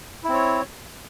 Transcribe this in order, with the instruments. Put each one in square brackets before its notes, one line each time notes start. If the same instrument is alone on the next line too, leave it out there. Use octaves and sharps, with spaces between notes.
[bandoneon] E4
C4
C#5